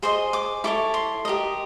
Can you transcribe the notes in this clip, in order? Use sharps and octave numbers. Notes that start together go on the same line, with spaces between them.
G#4 C5 D#5 C6
D6
E4 A4 C#5 D6
C6
G4 A#4 D#5